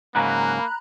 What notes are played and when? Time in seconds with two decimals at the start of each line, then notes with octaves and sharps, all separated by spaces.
0.15 G#2 C#3 F#3 A#3 A#5 B5 F#6